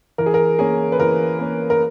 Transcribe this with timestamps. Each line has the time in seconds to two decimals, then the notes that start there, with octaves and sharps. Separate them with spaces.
0.18 E3 A#4
0.26 G#4
0.34 A#4
0.59 A#3 C#4 G#4
0.92 B4
0.99 E3 A#4
1.39 A#3 C#4
1.70 A#4